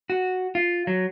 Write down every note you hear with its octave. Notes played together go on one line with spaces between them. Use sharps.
F#4
F4
F#3